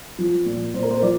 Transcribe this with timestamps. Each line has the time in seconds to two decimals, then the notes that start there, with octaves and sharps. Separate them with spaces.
0.19 F3
0.46 A#2
0.74 A#2 C5
0.83 A#4
0.91 C5
1.02 F3 D5